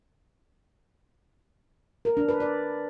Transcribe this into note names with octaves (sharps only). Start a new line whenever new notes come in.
A#4
D4
B4
D5